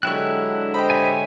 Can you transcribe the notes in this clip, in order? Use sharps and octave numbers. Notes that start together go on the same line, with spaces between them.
D3 F#3 G#3 D4 E4 G4 C#5 F#6
G4 C5 D#5 B5
C#5 E5 G#5